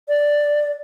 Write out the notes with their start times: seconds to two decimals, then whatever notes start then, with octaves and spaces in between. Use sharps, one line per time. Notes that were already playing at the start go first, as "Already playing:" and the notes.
0.09 D5